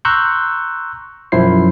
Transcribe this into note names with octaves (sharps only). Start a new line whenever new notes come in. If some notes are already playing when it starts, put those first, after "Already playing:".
A#5 C6 C#6 E6 F#6 G6
B1 F#2 F3 E4 C5 C7